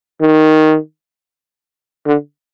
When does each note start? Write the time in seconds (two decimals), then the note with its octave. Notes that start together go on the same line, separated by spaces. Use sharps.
0.21 D#3
2.06 D3